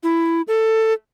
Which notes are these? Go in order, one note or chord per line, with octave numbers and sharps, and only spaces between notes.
E4
A4